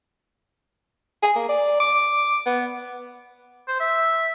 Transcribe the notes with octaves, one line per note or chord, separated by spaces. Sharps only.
G#4
A#3
D5
D6
B3
C5
E5